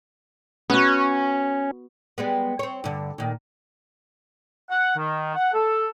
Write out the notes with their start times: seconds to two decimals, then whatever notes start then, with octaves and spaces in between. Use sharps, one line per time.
0.70 B3 C#4 F#4
2.18 G3 G#3 B3
2.59 C4 C#5
2.84 G2 D3
3.18 A#2 D#3
4.70 F#5
4.97 D#3
5.35 F#5
5.53 A4